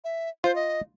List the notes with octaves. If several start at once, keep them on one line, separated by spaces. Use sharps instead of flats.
E5
F4 C5
D#5